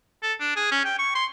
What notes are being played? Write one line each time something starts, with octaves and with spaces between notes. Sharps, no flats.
A4
D4
G#4
C#4
G5
C#6
C6